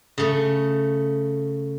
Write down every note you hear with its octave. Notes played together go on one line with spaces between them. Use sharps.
C#3 A3